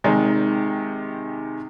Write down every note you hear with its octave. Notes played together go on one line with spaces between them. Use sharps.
C3 D#3 G#3